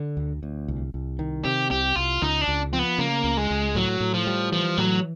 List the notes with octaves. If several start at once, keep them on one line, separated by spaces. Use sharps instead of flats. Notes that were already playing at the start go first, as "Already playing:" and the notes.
Already playing: D3
D2
D2
C2
C2
D#3
C3 G4
C2 G4
C2 F4
C#2 D#4
D4
C#2
F3 C4
B3
C#3 A#3
C#2
G#3
C#2
A2 F#3
A2
F3
G3
E3 F3
A2 F#3